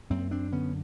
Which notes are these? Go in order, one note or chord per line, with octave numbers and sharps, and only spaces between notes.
F#2 A#3 C4
C4 D4
D3 B3 C#4